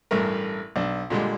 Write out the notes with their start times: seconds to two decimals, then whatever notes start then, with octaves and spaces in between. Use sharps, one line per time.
0.11 A1 G2 A3 A#4
0.76 B1 D4
1.10 A#2 D3 G3 G#3